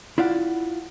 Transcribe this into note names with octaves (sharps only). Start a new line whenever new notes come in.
E4 F4 D5 F#5